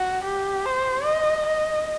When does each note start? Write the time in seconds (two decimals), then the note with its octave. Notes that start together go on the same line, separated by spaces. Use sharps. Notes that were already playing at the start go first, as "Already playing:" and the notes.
Already playing: F#4
0.24 G4
0.65 C5
1.06 D#5
1.46 D#5